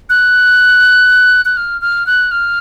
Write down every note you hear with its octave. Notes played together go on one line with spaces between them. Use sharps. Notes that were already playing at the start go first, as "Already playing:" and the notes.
F#6
F#6
F6
F6
F#6
F6